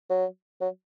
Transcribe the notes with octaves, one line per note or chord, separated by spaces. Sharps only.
F#3
F#3